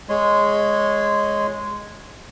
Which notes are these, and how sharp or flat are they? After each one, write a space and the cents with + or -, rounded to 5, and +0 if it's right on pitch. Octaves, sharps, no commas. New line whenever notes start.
G#3 +0 C#5 -10 C6 -15